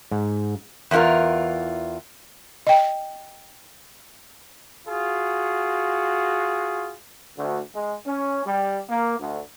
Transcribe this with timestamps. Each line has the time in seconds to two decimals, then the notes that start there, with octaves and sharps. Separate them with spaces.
0.11 G#2
0.91 E2 E3 B3 F4 A#4
2.67 D#5 G5
4.88 F4 F#4 G#4
7.37 D2
7.75 G#3
8.07 C#4
8.46 G3
8.90 A#3
9.20 D2